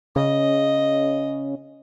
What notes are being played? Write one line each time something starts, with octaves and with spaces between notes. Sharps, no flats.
C#3 D#5